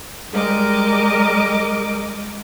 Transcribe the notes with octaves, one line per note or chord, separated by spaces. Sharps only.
G3 G#3 A#4 D#5 D6